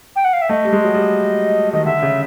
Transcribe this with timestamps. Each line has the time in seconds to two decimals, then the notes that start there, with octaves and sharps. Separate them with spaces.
0.16 G5
0.24 F#5
0.33 F5
0.41 E5
0.49 A3 D#5
0.65 G3
0.73 G#3
0.85 F#3
0.94 G3
1.73 D#3 D#5
1.85 D3 E5
2.03 C#3